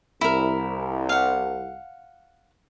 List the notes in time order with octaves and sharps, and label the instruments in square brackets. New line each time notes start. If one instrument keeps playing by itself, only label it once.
[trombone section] C2 [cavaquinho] E4 A#4
[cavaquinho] F5 F#5